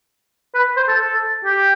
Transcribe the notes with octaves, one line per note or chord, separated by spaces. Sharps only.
B4
C5
A4
A4
G4